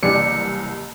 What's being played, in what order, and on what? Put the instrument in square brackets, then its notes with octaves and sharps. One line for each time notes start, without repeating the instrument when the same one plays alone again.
[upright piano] F#1 [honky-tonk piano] C2 E3 [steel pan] D4 G4 D5 [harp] C#7